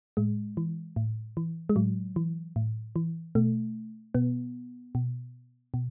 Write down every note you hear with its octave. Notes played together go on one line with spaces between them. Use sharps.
A2 G#3
E3
A2
E3
G#3
A2 F#3
E3
A2
E3
B2 A3
B2 B3
B2
B2